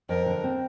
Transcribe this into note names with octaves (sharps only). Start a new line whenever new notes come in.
F2 A#4
D3
C4